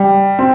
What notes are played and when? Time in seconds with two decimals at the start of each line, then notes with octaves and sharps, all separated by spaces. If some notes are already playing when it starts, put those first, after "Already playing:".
Already playing: G3
0.39 C4